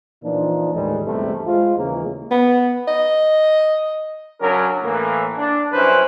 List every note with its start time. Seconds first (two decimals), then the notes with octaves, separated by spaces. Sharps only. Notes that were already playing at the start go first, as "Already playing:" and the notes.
0.24 A#2 E3 F3 D4 D#4
0.74 D#2 A2 E3 G3 G#3
1.06 A#1 E2 G2 C3 G3 A3
1.47 G#3 F4 C5
1.77 D#2 C#3 E3 G#3 A#3
2.31 B3
2.88 D#5
4.41 C#3 F#3 C#4 D4 A#4
4.83 A2 E3 A#3
5.37 D4
5.73 C2 F#2 C#4 E4 B4 C5